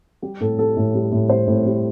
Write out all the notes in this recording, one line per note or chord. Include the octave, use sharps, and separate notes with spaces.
G3 G4
A2 A4
G3 A4
A2
G3
A2
G3 C5
A2
G3